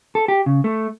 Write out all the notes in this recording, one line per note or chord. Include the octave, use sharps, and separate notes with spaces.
A4
G4
C#3
A3